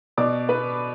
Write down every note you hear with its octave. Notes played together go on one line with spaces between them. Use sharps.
B2 D5 D6
B3 B4 B5